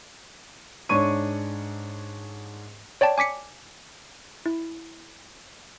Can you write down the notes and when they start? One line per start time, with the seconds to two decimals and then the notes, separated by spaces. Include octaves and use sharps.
0.89 G#2 D4 C#5 C#6 D#7
3.01 C#5 D5 G5 A5
3.18 G#5 D6 B6 C#7
4.46 E4